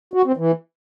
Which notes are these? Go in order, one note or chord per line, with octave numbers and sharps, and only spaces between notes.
F#4
C4
E3